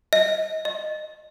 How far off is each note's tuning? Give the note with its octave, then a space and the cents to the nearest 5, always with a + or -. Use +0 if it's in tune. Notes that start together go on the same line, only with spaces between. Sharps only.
D#5 +25
D#5 -15